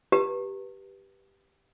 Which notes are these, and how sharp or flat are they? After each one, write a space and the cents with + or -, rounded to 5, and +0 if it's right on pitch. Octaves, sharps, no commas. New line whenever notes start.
G4 +0 B4 -15 A#5 -40